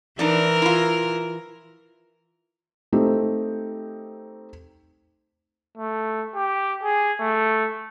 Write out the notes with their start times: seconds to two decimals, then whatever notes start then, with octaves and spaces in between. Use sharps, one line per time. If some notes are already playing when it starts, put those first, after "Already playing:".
0.19 E3 D4 D#4 A#4 D5
0.62 E4 F4
2.92 A3 C4 D#4 G4
5.77 A3
6.35 G4
6.83 G#4
7.20 A3